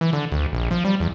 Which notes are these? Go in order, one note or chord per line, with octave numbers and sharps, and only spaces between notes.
E3
D3
D2
A#1
F3
G3
E2